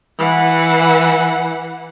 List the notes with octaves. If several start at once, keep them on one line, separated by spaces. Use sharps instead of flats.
E3 F#5